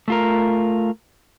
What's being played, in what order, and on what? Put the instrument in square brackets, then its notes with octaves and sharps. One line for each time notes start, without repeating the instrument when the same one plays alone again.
[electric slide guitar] A3 F4 A#4